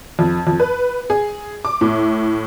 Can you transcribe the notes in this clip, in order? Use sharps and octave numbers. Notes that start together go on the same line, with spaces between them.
F2
F2
B4
G#4
D6
A2